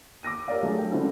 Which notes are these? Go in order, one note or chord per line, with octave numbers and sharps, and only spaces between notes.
D6 E6 A#6 D#7
G4 A#4 C#5 D5 F5
F#3 A3 D4 G#4
G5
C#3 G#3 C4 E4 F#4 A4